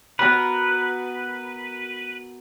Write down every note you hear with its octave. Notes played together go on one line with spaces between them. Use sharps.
B3 F#4 A#4 B4